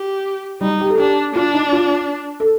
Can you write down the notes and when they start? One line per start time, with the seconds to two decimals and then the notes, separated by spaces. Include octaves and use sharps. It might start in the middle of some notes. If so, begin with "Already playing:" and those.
Already playing: G4
0.61 G3 D#4
0.80 G4
0.90 A4
0.98 D4 G4
1.35 D4 F4
1.54 D#4
1.72 F4
2.40 A4